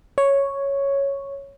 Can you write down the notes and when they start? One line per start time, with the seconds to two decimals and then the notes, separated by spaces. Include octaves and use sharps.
0.18 C#5